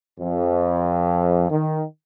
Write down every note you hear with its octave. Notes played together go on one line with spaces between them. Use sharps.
F2
D#3